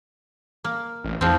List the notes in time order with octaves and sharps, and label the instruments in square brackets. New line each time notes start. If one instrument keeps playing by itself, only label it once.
[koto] A#3
[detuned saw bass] A1
[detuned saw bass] E2 [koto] F3 C4